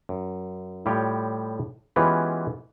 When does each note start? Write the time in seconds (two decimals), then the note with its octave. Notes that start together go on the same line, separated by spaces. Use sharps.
0.09 F#2
0.86 A2 G3 F4 G4 C#5
1.96 E3 G#3 B3 C#4 F4 G4